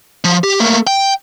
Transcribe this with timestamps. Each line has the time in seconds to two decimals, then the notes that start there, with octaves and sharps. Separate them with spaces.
0.24 F3
0.44 G4
0.60 A3 A#3
0.87 G5